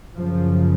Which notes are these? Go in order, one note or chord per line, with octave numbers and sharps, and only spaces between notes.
F#2 C#3 F3